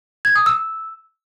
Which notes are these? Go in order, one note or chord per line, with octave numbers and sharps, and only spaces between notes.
G#6
D#6
E6